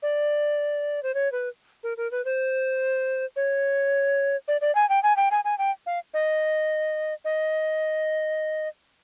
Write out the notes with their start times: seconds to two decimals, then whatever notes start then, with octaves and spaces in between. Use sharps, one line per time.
0.03 D5
1.03 C5
1.14 C#5
1.32 B4
1.83 A#4
1.97 A#4
2.11 B4
2.25 C5
3.36 C#5
4.48 D5
4.61 D5
4.75 G#5
4.89 G5
5.03 G#5
5.17 G5
5.31 G#5
5.45 G#5
5.58 G5
5.86 F5
6.14 D#5
7.25 D#5